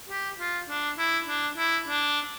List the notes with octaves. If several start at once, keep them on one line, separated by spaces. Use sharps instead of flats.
G4
F4
D4
E4
D4
E4
D4